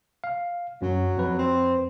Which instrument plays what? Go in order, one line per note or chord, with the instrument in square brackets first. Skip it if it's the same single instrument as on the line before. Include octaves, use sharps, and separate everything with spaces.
[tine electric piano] F5
[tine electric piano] F#2 [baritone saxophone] F#3
[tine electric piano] F2 B4
[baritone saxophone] C4